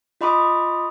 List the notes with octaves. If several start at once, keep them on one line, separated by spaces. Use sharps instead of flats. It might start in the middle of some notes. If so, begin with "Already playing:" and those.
F4 D#5 B5 C6 D6 D#6